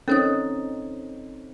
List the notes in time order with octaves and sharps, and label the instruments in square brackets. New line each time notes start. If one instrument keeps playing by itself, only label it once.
[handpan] C4 D#4 [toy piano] C#4 A#4 C5 [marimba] A4 C#5 D#6